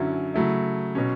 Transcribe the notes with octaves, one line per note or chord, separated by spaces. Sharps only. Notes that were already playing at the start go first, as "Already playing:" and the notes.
Already playing: F#2 D3 F#3 C#4 E4
C#3 F#3 A3 E4
B2 F#3 C#4